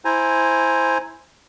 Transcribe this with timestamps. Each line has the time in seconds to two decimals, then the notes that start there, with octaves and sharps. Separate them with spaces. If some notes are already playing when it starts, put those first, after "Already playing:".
0.05 E4 C5 G#5 A#5